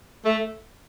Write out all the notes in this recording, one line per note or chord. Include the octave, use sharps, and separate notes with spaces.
A3